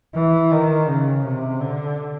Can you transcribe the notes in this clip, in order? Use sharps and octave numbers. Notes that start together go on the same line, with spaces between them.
E3
D#3
C#3
C3
D3